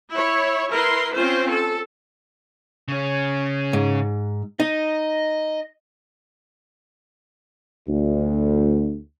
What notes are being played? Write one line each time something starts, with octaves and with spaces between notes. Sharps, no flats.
E4 C#5
E4 A#4 B4 C6
C4 C#4 F4 C5
A4
C#3 C#4
G#2
D#4 D#5
D2